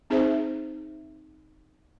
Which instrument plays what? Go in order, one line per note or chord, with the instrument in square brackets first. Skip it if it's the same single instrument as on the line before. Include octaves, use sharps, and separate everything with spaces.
[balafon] C4 D#4 G#4 C5 E5